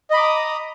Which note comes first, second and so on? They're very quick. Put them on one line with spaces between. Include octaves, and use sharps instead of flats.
D#5 B5 D6 A#5 D#6